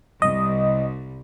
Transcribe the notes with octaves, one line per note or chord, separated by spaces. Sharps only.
C2 D#5